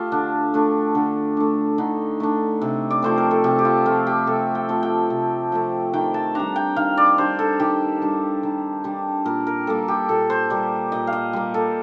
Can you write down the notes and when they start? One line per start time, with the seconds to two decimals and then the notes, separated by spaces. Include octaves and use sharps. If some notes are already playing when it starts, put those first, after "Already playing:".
Already playing: A3 F4 G4 A4
0.12 D3 D4
0.54 A3 D4
0.95 D3
1.37 A3 D4
1.78 D3 D#4
2.20 A3 D4
2.61 C3
2.90 D5
3.02 F3 A3 C4 C5
3.17 A#4
3.31 A4
3.44 C3 G4
3.59 G4
3.65 F4
3.86 F3 A3 C4 F4
4.07 G4
4.27 C3 A4
4.55 G5
4.69 F3 A3 C4
4.83 G5
5.10 C3
5.52 F3 A3 C4
5.93 D#3 G5
6.14 A5
6.35 G3 D4 A#5
6.56 G5
6.76 D#3 F5
6.97 D5
7.18 G3 D4 C5
7.39 A4
7.60 D#3 G4
8.02 G3 D4
8.43 D#3
8.84 G3 D4
9.25 A#2 A#4
9.47 A#4
9.67 G3 A#3 A4
9.88 G4
10.09 A#2 A4
10.30 C5
10.50 G3 A#3 D5
10.92 A#2 D#5
11.07 F5
11.13 D#5
11.33 G3 A#3
11.54 A4